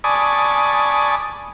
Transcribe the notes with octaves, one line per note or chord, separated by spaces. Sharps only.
D5 G#5 A5 B5 C#6 D#6